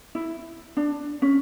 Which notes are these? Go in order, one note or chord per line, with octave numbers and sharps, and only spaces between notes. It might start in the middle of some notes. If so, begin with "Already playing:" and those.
E4
D4
C#4